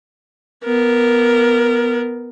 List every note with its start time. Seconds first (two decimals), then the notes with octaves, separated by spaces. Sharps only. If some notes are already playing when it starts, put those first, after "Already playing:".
0.65 B3 A#4